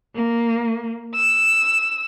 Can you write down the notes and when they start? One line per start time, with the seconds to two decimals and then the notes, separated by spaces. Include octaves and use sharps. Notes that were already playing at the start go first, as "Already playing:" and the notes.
0.16 A#3
1.14 E6